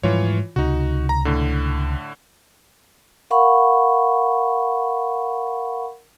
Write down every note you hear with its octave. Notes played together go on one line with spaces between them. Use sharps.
G#2 E3 F3 G3 F4 C#5
C#2 C3 D#4 F#4
A#5
A2 D3
A#4 F5 F#5 B5 C#6